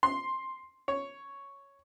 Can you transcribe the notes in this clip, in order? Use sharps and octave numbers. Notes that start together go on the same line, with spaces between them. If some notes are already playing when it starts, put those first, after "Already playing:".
C6
C#5